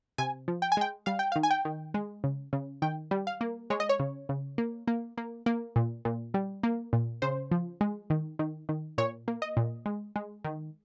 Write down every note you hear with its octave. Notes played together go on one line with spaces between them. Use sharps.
C3 G#5
F3
G5
G#5
G#3 G5
G3 F5
G5
F5
D#3
G#5
G5
D#3
G#3
C#3
C#3
D#3 G5
G3
F5
A#3
G#3 C#5
D#5
C#5
C#3
C#3
A#3
A#3
A#3
A#3
A#2
A#2
G3
A#3
A#2
C#3 C5
F3
G#3
D#3
D#3
D#3
A#2 C#5
A#3
D#5
A#2
G#3
G#3
D#3